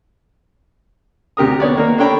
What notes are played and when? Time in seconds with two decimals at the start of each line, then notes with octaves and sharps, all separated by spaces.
1.37 D2 C3 G4 A#4 D#6
1.60 B3 C#5 D5
1.75 D#3 A#3 A#4
1.98 D4 A4 C#5 G5 A#5 B5